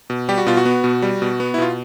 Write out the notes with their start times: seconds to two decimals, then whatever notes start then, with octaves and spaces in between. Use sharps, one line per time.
0.10 B2
0.29 G3 G4
0.38 F#4
0.46 B2 F4
0.57 F#4
0.65 B3
0.84 B2
1.02 G3
1.22 B2
1.40 B3
1.54 E4
1.58 B2 F4